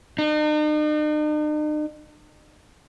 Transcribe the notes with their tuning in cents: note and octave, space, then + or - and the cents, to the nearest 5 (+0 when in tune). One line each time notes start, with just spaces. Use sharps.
D#4 -45